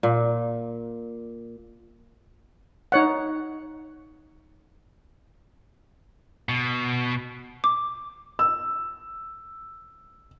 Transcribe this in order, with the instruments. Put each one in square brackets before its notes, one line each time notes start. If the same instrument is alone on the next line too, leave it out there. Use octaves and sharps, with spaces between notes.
[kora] A#2
[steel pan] D#4 C#5 F#5
[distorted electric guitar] B2
[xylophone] D6
[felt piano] E6